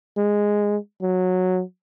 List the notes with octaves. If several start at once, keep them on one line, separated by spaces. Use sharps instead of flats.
G#3
F#3